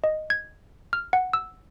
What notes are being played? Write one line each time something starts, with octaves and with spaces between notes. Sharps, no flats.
D#5
G#6
F6
F#5
E6